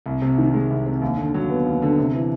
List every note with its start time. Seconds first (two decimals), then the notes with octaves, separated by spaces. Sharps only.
0.06 C2
0.22 C3
0.38 D#3
0.54 G#3
0.70 C2
0.86 C3
1.02 D#2
1.18 D3
1.34 F#3
1.50 B3
1.66 D#2
1.82 D3
1.98 C3
2.14 E3